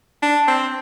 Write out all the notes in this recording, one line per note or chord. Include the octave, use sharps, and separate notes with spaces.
D4
C4